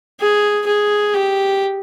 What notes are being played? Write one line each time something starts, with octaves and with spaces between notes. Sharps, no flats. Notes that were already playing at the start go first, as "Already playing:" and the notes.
G#4
G#4
G4